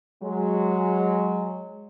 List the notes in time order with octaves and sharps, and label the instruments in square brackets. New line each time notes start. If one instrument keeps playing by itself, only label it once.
[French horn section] F#3 G#3